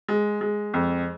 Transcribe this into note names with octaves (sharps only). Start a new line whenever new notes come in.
G#3
G#3
F2